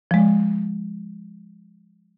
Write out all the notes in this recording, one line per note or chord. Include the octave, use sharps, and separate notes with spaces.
F3 G#3